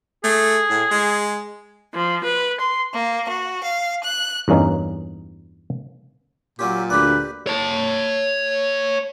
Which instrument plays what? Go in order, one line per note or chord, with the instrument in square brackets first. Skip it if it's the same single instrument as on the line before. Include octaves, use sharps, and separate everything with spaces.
[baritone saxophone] A3 [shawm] G#4
[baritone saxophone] A2
G#3
[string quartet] F3
B4
C6
A#3
F#4
F5
F#6
[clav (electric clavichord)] E2 G2 A#3 C#4 D#4
[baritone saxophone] A#2 [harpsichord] F#3 C#4 G4
[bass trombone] D2 [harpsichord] G4 D5 [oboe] B4
[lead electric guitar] C#5 A5